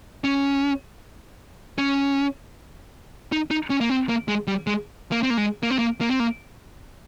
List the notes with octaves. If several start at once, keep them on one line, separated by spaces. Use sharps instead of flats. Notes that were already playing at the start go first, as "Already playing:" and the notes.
C#4
C#4
D#4
D#4
C#4
A#3
C4
A#3
G#3
G3
G#3
A#3
C4
A#3
G#3
A#3
C4
A#3
A#3
C4
A#3